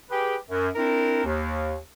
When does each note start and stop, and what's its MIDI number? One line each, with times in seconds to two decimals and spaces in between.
0.11 0.35 67
0.11 0.35 68
0.11 0.35 71
0.49 0.69 42
0.75 1.22 60
0.75 1.22 62
0.75 1.22 64
0.75 1.22 70
1.25 1.76 39